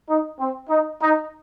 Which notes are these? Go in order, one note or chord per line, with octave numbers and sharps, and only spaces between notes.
D#4
C4
D#4
D#4